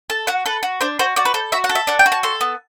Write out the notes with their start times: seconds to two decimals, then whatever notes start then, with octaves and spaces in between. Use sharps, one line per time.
0.10 A4 A5
0.27 F#4 F#5
0.46 A4 B4
0.63 F#4
0.81 D4 C5
0.99 F#4 C5
1.16 F#4 D5
1.25 B4
1.34 A4 C5
1.52 F#4 E5
1.64 F#5
1.69 A4
1.75 E5
1.87 D4 F#5
1.99 G5
2.06 F#4
2.12 A5
2.23 A4 C6
2.41 B3